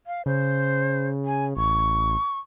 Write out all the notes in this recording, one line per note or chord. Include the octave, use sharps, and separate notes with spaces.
F5
C#3 C5
G#5
A1 C#6